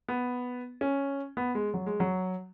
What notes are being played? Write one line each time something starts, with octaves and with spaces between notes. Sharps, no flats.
B3
C#4
B3
G#3
F#3
G#3
F#3